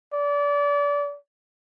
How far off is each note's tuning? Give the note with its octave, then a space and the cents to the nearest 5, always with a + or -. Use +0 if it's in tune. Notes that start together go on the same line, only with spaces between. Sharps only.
D5 -30